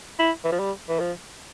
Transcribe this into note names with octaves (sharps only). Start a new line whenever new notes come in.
E4
E3
F3
G3
E3
F3